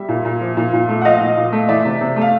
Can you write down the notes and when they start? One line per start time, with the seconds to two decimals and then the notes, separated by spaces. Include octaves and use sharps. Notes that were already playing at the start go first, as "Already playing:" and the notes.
Already playing: G3 E5
0.09 A#2
0.25 A#2
0.41 F3
0.57 A#2
0.73 A#2
0.89 A3
1.01 F#5
1.05 F3 D#5 F5
1.21 A#2
1.37 A#2
1.53 A3
1.69 E3 D5 E5
1.85 C3
2.01 C3
2.16 A3
2.22 F5